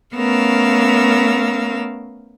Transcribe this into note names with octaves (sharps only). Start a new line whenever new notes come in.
A3 B3 C#4 A#4 F5 E6